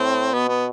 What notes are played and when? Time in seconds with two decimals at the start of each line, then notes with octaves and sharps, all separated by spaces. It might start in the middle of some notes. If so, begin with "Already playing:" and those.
Already playing: A2 C4
0.33 B2 B3
0.49 B3